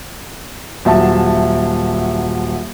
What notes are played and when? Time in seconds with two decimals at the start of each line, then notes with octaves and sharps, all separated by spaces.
0.85 D#1 F#3 E5 A5